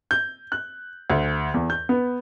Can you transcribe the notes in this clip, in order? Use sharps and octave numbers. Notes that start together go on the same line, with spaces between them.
G6
F#6
D2
E2
G6
B3